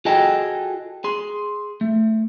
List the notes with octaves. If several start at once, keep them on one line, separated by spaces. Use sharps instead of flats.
F4 F#4 G#4 A4 D#5 G5
G#4 C6
A3